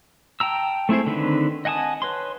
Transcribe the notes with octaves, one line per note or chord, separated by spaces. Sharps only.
G5 A5 A#5 E6
A3 C4 E4 G#4 C5
D3 D#3 C4 B4
D#5 F#5 G#5 A5 D#6
B4 C#5 C6